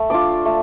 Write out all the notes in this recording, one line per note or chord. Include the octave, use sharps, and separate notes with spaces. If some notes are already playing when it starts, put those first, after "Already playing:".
Already playing: A3
D4 F4 D5 D6
A3